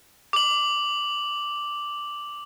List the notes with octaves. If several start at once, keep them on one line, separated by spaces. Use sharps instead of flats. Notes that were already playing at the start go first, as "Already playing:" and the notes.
D6 F#7